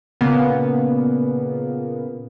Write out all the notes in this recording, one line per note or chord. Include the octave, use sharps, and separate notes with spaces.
A#2 C#3 A#3 B3